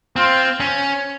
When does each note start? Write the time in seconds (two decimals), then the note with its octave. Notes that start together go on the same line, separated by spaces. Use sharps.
0.16 C4 F4
0.60 C#4